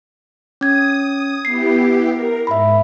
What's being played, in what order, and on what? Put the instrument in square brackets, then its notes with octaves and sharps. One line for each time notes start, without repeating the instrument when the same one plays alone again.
[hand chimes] C#4 G#6 [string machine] D#6
[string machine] B3 E4 G4 [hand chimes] C7
[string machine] A#4
[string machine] G#2 [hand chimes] E5 B5